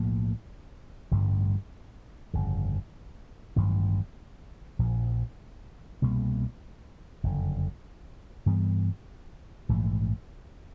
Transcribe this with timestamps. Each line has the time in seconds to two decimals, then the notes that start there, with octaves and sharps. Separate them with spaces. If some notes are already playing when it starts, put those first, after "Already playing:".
Already playing: B1 A2 F3 A#3
1.11 A1 G2 D3 G3
2.34 G1 F2 C#3
3.56 A1 G2 D#3 F#3
4.79 A#1 A#2 F3
6.02 C2 B2 G3 A#3
7.23 F#1 F2 D3
8.46 G2 E3 G3 B3
9.69 A#1 G#2 E3 A3